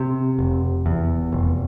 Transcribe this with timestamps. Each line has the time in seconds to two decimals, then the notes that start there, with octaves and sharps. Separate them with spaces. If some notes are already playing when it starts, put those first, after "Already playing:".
Already playing: C3
0.39 F1
0.86 E2
1.32 F1